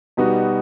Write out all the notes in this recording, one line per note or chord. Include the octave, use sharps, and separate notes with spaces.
B2 G3 B3 D#4 F#4